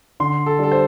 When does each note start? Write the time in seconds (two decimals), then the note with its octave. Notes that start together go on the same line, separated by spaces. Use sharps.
0.20 D3 C6
0.46 A4
0.59 G3 D4 A4
0.72 C5